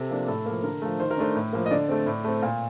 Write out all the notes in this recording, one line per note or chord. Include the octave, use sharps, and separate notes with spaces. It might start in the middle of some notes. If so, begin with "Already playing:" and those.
Already playing: C3 A4
F3 A#3 D4
A2 A4
F3 A#3
D3 A#4
F3 A3
D#3 C5
A#4
A3 D4 C5
A2
F3 A#3
D#5
D3 D5
A3 C4
A2
A3 C4
A#2